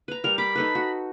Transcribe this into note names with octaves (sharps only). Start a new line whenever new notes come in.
B4 A#5
G3 A#4 F7
B5 D6
D#4 A4 B4
F#4